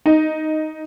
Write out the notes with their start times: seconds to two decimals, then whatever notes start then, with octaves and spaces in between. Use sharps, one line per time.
0.06 D#4